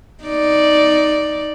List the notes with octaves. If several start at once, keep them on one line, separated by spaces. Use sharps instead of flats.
D#4 D5